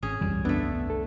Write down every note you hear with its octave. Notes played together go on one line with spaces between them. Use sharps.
G#1 C#4 G#4
E1 C2 F#2 E3 G3
D3 A3 B3
A4